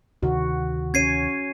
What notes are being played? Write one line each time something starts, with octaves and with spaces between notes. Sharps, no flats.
D2 C3 D#3 F#4
C#4 C#5 G#6 C7 D#7